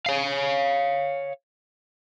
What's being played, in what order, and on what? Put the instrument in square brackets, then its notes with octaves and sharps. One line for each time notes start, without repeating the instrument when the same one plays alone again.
[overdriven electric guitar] C#5 F5